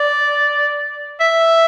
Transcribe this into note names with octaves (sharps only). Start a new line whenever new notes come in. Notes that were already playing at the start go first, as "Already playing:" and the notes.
Already playing: D5
E5